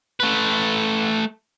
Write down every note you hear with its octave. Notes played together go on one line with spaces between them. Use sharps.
A3 B4